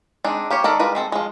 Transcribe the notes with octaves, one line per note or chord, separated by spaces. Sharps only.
G#3 C4 D4 D#4
A#3 G4 C5 C#5
D#3 A4 A#4 D5
G3 G#3 F4 A#4 B4
G#3 C4 A4
F3 G#3